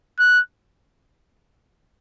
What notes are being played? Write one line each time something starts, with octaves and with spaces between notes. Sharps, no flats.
F#6